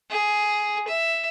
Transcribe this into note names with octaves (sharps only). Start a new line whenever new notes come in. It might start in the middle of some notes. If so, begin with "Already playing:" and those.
G#4
E5